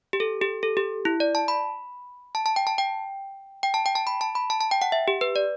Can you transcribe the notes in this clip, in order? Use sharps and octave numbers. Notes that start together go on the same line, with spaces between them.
G4
A4
G4
A4
G4
E4
D5
A5
B5
A5
A5
G5
A5
G5
G5
A5
G5
A5
B5
A5
B5
A5
A5
G5
F#5
E5
G4
B4
D5